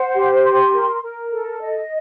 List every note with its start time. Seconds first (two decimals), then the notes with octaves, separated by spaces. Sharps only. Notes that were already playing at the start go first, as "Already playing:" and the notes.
Already playing: C5 F#5
0.15 G4
0.44 C6
0.74 A#4
1.03 A#4
1.32 A4
1.61 D#5